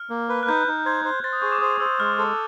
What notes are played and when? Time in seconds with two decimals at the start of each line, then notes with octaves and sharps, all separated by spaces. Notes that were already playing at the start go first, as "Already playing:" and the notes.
Already playing: F6
0.10 A#3
0.29 B4
0.43 F#6
0.48 D#4 G6
0.68 D#4
0.85 C5 G#6
1.05 C5
1.23 C5 A6
1.33 D#6
1.42 G#4 C#6
1.52 D6
1.61 C5 D#6
1.80 C5 E6
2.00 G#3 F6
2.18 A4